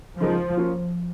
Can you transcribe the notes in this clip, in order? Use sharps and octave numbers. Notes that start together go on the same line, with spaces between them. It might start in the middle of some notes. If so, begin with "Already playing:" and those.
C#3 F3 G#3 D#4 A#4
F3 A#3 C#4 F4